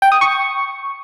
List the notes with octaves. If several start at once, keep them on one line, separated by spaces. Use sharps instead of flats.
G5
D#6
C#6